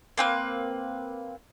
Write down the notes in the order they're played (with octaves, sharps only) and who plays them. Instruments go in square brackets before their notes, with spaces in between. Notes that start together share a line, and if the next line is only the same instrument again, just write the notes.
[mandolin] A#3 C4 B4